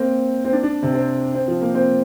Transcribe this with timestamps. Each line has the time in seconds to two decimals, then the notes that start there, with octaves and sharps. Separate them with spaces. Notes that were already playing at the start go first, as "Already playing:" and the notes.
Already playing: A#3 C4
0.45 C4
0.53 D4
0.63 D4
0.83 C3
0.94 C4
1.35 C4
1.48 F3
1.61 A#3
1.75 C4